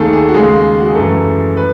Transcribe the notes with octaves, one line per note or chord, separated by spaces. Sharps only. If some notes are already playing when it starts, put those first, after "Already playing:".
Already playing: D#2 D#3 A3 G#4 A4
G#4
F#4
D#2 C#3 G#3 G#4
F#4
G#4
F#2 E3 A3 A4
B4